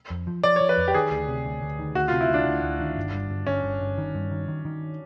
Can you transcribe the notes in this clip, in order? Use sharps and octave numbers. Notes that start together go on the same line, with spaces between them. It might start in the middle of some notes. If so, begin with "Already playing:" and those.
F2
F3
F3 D5
C#5
F3
B4
F2
G4
D#3 G#4
D2
C3
D2
D2
D#3
D2 F#4
F4
C3
E4
D2
D4
D2
D2
D#3
G1
G2
G1
G1 C#4
G1
G1
D#3
G2
D#3
D#3
D#3